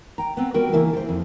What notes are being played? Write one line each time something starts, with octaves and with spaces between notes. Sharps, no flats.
G5 A#5
B3 C4
G3 B3 F#4 A#4 G5
C#3 E3 A#3 E4
A4 C5
F2